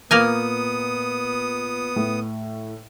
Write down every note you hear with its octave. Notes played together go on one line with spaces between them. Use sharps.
A#2 A#3 B3 A#4 G#5 D#6
A2